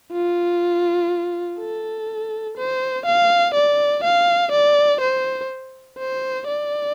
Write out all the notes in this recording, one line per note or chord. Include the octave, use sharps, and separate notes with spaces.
F4
A4
C5
F5
D5
F5
D5
C5
C5
D5